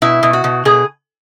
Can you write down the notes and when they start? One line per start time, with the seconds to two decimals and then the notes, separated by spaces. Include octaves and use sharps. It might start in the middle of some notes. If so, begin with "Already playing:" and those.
0.02 B2 E4
0.23 B2
0.33 F#4
0.44 B2
0.65 B2 G#4